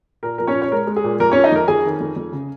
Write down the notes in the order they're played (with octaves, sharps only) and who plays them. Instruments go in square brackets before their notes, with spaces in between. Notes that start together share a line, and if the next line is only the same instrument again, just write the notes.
[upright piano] A#2 A#4
F3 A#4
C#4 C#5
A#2
C#5
G#3 A#4
G#3
G#4
A#2
F2 A#4
C#4 C#5
F3
D#4 D#5
F2 A#4
F2 G#4 G#5
D#3
F2
F2
C#3